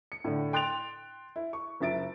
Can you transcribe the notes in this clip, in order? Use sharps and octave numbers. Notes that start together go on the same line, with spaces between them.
C#7
A2 D3
G5 C6 F#6 A6 D7 F7
E4
C#6
F#1 C#2 E5 A6 D7